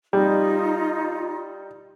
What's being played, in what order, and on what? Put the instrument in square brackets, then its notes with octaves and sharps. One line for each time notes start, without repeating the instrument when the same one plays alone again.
[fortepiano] G3 [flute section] D#4 F4